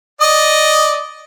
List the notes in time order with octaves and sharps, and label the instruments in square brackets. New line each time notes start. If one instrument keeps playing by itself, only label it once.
[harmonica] D5 D#5 D#6